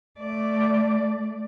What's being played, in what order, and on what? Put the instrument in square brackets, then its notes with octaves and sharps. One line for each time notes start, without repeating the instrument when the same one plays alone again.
[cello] A3 D5